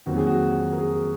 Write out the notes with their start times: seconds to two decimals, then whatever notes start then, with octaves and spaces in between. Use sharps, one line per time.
0.06 F2 D#3 F#3 A#3 F#4
0.17 G#4
0.27 F#4
0.73 A#4
0.78 G#4